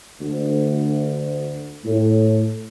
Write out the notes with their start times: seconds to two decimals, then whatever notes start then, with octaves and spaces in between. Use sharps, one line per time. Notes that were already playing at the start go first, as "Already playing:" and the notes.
0.20 D2
1.84 A2